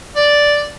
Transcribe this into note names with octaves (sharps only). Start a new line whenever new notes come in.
D5